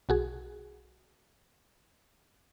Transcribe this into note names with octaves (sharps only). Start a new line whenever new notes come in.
B1 F#4 G#4